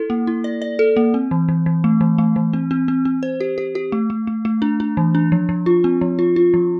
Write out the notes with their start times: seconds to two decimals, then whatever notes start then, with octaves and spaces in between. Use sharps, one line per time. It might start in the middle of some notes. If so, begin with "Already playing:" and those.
Already playing: E4 A4
0.10 A#3
0.27 E4
0.44 D5
0.62 D5
0.79 A4
0.97 A#3
1.14 C4
1.31 E3
1.49 E3
1.66 E3
1.84 A3
2.01 E3
2.18 A3
2.36 E3
2.53 C4
2.71 C4
2.88 C4
3.05 C4
3.23 C5
3.40 G4
3.58 G4
3.75 G4
3.92 A3
4.10 A3
4.27 A3
4.45 A3
4.62 D4
4.80 D4
4.97 E3
5.15 D4
5.32 F3
5.49 F3
5.66 F4
5.84 C4
6.01 F3
6.19 F4
6.36 F4
6.54 F3